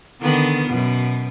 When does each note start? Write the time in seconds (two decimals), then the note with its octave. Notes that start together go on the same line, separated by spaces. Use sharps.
0.21 D3 D#3 B3
0.66 F#2 B2